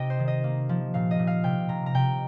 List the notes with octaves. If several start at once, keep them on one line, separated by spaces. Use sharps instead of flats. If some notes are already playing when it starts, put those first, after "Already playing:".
Already playing: C3 D#4 G4 D#5 G5
C5
D#3
D#5
A#3
F3
A#2 F5
D#5
A#2
F5
C3 G5
C3 A#5
A#5
C3 G5